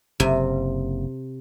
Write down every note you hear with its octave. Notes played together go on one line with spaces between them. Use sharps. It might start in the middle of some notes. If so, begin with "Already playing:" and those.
F#1 C3